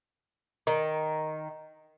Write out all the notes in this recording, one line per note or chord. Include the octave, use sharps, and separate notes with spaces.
D#3